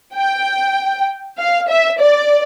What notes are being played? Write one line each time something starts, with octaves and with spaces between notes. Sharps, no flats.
G5
F5
E5
D5